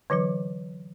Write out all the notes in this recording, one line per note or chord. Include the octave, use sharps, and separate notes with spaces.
D3 E3 F#3 B4